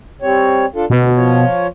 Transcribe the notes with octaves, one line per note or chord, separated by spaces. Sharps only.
G3 C4 C#5
D4 F4 A4
D2 B2
F3 F4 C#5